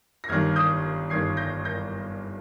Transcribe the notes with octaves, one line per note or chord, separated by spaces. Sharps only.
A#6
G1 G2 D#3 F6 G#6
D#6 G6
G1 G2 D#3 G#6 C7
G6 A#6
G6 A#6